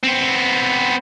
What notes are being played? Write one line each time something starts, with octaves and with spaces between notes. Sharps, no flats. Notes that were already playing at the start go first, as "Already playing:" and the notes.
B3 C4